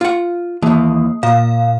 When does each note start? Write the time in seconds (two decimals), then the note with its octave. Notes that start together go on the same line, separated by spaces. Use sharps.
0.01 F4 F#5
0.62 D#2 E3 A#3
1.23 A#2 F5